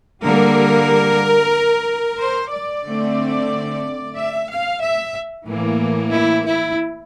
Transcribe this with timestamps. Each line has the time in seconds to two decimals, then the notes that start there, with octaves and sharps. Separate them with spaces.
0.23 D3 G3 A#3 A#4
2.20 C5
2.53 D5
2.86 D3 A3 C4
4.16 E5
4.48 F5
4.81 E5
5.47 A2 E3 A#3
6.12 E4
6.45 E4